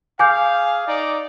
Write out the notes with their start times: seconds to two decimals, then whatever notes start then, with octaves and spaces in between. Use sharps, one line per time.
0.19 G#4 F5 G#5 D6 G6
0.87 D#4 D5